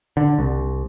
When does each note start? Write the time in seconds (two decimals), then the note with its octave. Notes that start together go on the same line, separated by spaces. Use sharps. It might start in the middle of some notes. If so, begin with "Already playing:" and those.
0.17 D3
0.39 C2